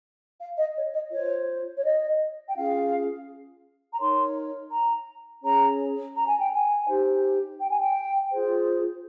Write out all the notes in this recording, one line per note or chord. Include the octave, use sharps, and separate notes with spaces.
F5
D#5
C#5
D#5
F4 C5 C#5
C#5
D#5
G5
C#4 F4 G#4 F5
A#5
D#4 A#4 C#5 C6
A#5
C#4 G#4 C#5 A#5
A#5
G#5
G5
G#5
D#4 G4 C5
G5
G#5
G5
F4 G#4 C5